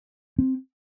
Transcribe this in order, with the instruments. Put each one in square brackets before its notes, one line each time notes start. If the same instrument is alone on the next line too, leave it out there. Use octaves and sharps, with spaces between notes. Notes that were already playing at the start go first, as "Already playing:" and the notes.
[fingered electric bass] C4